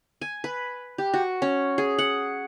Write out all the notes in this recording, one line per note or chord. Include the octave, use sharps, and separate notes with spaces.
G#5
B4
G4
F#4
C#4
G#4
F#5